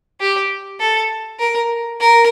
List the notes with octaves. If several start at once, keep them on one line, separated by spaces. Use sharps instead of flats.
G4
A4
A#4
A#4